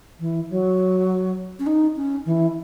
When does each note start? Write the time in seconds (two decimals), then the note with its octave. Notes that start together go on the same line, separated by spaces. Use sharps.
0.20 E3
0.50 F#3
1.59 C#4
1.66 D#4
1.96 C#4
2.26 E3